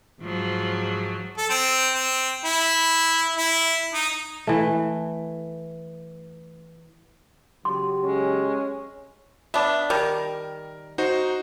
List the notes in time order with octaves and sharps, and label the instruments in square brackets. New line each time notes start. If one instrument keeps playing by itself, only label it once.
[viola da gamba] G#2 F3 F#3
[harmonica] A4
C4
C4
E4
E4
D#4
[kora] E3 A3
[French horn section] C#3 F#3 G4 [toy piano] C6
[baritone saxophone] G#3 [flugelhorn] C#4
[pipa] B3 D4 [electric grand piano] E5
[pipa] D#3 G3 [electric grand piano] A#4
[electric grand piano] D#4 F#4 C5